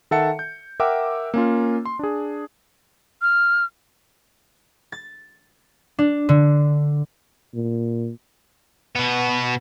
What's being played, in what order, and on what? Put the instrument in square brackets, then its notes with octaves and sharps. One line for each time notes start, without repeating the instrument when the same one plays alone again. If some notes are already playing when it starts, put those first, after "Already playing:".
[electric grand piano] D#3 A4 E5 F#5 A5 C#7
G6
A#4 E5 F#5 G5 D6 E6
A#3 C#4 F4
C6
D4 G#4
[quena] F6
[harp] A6
D4
D3
[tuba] A#2
[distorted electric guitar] B2 B3